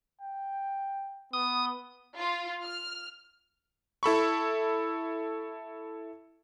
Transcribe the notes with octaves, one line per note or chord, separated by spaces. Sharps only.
G5
B3 D#6
F4
F6
E4 A4 B5 C#6